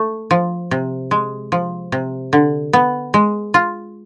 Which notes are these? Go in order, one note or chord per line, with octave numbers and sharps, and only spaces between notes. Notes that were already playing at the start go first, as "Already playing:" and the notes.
Already playing: A3
F3
C3
G#3
F3
C3
D3
B3
G#3
F4